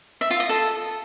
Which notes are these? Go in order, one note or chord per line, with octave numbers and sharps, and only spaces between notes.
E5
F4
D#5
A4